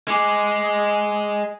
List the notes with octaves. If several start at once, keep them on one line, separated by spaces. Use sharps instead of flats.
G#3 G#5 D6 C#7